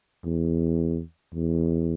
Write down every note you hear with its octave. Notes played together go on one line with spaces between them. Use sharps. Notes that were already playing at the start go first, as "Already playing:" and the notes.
E2
E2